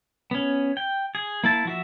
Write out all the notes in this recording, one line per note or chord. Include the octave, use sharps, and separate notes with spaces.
B3 C#4
G5
G#4
A#3 E4 A5
F3 F#4 E5